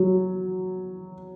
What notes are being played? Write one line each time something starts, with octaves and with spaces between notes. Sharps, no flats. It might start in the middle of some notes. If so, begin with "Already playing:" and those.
Already playing: F#3